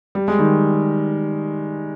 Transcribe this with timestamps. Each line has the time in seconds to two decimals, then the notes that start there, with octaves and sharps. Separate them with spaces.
0.15 G3
0.28 G#3
0.39 D#3 G3